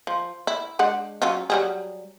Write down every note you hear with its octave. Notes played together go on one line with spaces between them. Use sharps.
F3
E4
G#3 D4 F#5
F#3 C#4 F4
F#3 G3 G#4